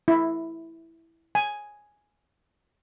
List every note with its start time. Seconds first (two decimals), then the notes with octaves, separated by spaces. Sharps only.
0.08 E4
1.35 G#5